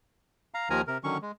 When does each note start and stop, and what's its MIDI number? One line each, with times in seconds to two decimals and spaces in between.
0.54 0.69 77
0.54 0.69 82
0.70 0.81 39
0.70 0.81 51
0.70 0.81 53
0.70 0.81 70
0.70 0.81 80
0.70 0.81 82
0.87 0.98 48
0.87 0.98 70
1.04 1.17 50
1.04 1.17 51
1.04 1.17 54
1.04 1.17 61
1.04 1.17 85
1.22 1.31 56